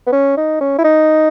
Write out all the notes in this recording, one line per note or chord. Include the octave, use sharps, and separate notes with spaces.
B3
C#4
D#4
C#4
E4
D#4